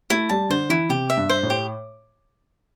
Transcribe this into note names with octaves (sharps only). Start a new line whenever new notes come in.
A3 E4
G3 A5
D3 C5
E3 E4
C3 G4
E5
G2
C5
A2
G4